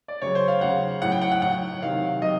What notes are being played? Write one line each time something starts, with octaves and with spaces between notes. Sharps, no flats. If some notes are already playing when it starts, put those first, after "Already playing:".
D5
C#3 F#3 C#5
C5
F5
C#3 F#3 F#5
A2 F#3 F#5
G5
F#5
F#5
A2 F#3 F#5
C3 D#3 F#3 F5
C3 D#3 F#3 D#5